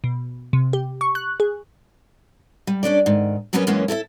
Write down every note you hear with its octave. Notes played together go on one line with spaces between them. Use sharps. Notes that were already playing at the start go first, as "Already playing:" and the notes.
B2
C3
G4
C#6
F#6
G#4
G3
C#4 D4 A4 D5
G#2 D#3
F#3 G3 B3 C#4 A#4 B4
F#2 E3 G#3 A#3 B3 C#4
E4 A4 B4 E5